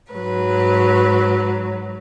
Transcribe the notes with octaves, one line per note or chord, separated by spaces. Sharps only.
G#2 F#3 B4